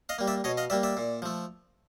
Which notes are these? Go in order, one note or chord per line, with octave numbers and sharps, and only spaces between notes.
D#5 F5
G3 A#3
D5 E5
B2 C#5 D#5
D#5 F5
G3 A#3 D5 E5
D5 E5
A#2
F3 A3